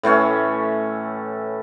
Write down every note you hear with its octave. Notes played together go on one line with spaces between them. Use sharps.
A2 E3 A3 C#4